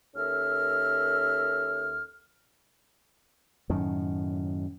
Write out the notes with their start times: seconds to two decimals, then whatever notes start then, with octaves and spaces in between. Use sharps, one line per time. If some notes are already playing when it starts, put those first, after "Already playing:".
0.15 D#2 C#4 A4 A#4 E5 F6
3.70 F#2 A2 D#3